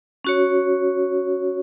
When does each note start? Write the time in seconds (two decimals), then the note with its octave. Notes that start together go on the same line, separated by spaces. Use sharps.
0.25 C#4 F#4 C#5